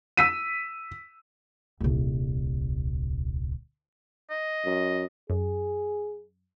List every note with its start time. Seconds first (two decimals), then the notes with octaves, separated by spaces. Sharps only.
0.17 E6 B6 D#7
1.80 D#1 C2
4.30 D#5
4.65 F#2
5.30 F#2 G#4